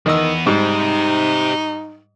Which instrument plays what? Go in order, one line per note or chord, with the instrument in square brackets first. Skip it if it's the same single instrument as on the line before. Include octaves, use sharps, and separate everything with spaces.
[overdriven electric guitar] E2 B3 [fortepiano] D#3 D#5 E6
[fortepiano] G#2 G3 [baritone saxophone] D#4 [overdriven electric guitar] G4 C5